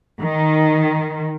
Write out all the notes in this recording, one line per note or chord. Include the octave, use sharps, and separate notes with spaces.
D#3